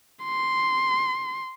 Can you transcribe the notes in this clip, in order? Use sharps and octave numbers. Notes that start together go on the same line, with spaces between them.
C6